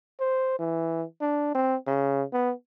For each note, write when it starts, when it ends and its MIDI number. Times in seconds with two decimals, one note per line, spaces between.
0.20 0.59 72
0.59 1.03 52
1.21 1.51 62
1.55 1.76 60
1.87 2.23 49
2.33 2.52 59